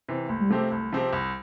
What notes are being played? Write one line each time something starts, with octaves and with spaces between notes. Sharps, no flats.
C3 E3 C4
C2 A3
G3
C3 F3 A3 C4 G4
C2
C3 F3 C4 G4
C2